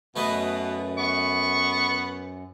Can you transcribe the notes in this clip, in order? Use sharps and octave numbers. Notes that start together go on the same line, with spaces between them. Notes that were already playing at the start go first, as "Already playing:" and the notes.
F#2 B2 A3 B4 D#5
B3 C#6